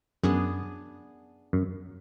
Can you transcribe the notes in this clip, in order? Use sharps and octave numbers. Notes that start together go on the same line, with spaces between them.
F#2 B3 D4 G#4
F#2